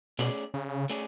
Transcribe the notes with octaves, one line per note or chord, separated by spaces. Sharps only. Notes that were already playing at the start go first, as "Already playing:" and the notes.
B2 A3 C#4 G#4 D5
C#3
A3 C#4 G#4 D5